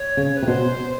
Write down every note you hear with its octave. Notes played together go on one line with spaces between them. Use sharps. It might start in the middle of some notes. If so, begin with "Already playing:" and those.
Already playing: C#5
C#3
B4
C3
B2 C5